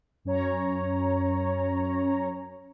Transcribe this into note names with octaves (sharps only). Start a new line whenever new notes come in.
F#2 C#4 C#5 A#5